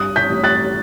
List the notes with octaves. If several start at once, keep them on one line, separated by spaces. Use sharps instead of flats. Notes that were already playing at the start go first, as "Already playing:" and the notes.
Already playing: G2 D#6 F#6
G6 B6
A1
F#6 A6